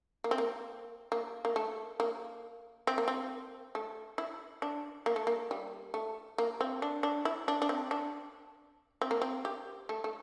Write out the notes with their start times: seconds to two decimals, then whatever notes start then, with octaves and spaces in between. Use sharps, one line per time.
0.24 A#3
0.31 C4
0.38 A#3
1.12 A#3
1.45 A#3
1.56 A3
2.00 A#3
2.87 C4
2.98 A#3
3.08 C4
3.75 A3
4.18 E4
4.62 D4
5.06 A#3
5.16 A3
5.27 A#3
5.51 G3
5.94 A3
6.38 A#3
6.61 C4
6.82 D4
7.03 D4
7.25 E4
7.48 D4
7.62 D4
7.69 C4
7.91 D4
9.01 C4
9.11 A#3
9.22 C4
9.45 G4
9.89 A3
10.04 A3